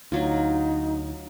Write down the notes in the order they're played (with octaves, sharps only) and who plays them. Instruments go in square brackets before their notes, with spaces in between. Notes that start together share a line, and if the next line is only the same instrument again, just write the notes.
[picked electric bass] D2 [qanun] F#3 F4 [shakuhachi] D#4